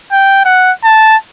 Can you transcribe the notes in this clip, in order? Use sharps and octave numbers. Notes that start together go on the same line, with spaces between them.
G5
F#5
A5